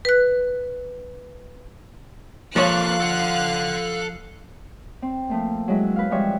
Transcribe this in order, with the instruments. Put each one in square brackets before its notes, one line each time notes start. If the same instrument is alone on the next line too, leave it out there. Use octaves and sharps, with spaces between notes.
[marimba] B4 F#6
[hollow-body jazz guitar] F3 C#5 [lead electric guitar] A#3 A4 [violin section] F5 F#6
[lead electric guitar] A4 F#5
[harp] C4
F3 A3 A#3
F#3 G#3 E4
B4 F5
E3 F3 G3 G#3 C#5 E5